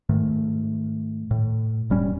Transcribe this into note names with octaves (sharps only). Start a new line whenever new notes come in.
G#2 D#3 A3
A2
E1 G3 C#4